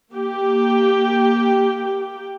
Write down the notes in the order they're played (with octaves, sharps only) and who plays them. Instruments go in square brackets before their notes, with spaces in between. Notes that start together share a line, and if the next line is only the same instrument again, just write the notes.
[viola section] A#3 G4 G5